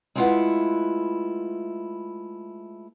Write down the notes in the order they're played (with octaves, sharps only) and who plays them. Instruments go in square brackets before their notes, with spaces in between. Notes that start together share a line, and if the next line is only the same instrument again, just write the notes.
[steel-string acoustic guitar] G#3 A3 E4 F4 B4 F#5